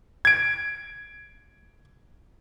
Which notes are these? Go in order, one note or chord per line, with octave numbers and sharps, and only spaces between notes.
G#6 D7